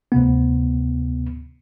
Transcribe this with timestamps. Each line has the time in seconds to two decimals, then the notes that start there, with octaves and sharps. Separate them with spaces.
0.12 D2 C3 B3